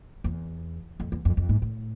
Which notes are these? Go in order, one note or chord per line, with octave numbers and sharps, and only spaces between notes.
E2
F2
E2
F2
F2
G#2
A2